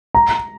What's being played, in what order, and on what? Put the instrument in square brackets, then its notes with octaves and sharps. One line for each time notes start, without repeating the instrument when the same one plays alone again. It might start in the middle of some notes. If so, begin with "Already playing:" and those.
[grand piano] A#5